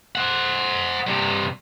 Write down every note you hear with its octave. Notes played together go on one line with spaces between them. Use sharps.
C5 F#5
G2 C3